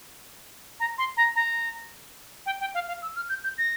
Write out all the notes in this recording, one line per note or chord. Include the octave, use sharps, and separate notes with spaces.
A#5
C6
A#5
A#5
G5
G5
F5
F5
E6
F6
G6
G6
A#6